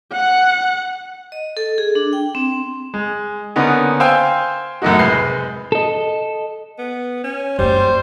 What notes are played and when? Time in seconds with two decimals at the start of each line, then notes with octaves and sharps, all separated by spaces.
0.13 F#5
1.32 D#5
1.57 A4
1.78 G#4
1.95 D4
2.13 G5
2.35 C4
2.94 G#3
3.56 D3 A#3 B3 C#4 D#4
4.00 C5 F5 G5 G#5 E6 G6
4.82 F#2 A2 A3 A#3 D#4 F#4
4.99 F1 G#3 B4 G6 C7
5.72 A4 D#5
6.78 B3
7.24 C#4
7.59 F#2 G3 A#3 C5